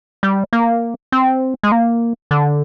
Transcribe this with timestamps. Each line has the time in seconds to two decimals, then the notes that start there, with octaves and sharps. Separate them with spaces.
0.23 G3
0.53 A#3
1.12 C4
1.63 G#3
1.72 A#3
2.31 D3